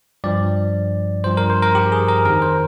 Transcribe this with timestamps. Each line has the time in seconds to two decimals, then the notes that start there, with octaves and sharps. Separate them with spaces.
0.24 G2 F3 D5
1.24 G2 F3 C5
1.37 A#4
1.50 C5
1.62 A#4
1.75 G4
1.92 G#4
2.08 A#4
2.25 F2 D#3 A#4
2.42 C5